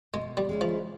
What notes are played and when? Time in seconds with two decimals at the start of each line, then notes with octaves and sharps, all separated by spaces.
0.14 B2 G#3
0.37 G3
0.49 G#3 C#4 E4
0.61 F3